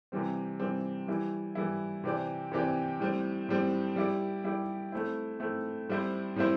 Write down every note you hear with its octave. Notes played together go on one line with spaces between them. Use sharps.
C3 E3 G3 C4
C3 E3 G3 C4
E3 G3 E4
E3 G3 E4
C3 E3 C4 G4 D5
C3 E3 C4 G4 D5
A2 G3 C4
A2 G3 C4
G3 E4 G4 D5
G3 E4 G4 D5
A3 C4 E4
A3 C4 E4
A2 G3 C4 E4 C5
A2 G3 C4 E4 C5